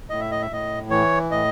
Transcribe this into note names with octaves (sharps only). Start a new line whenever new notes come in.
A2 D#5
E5
D#5
E5
A2 D#5
E3 C#5
A2 D#5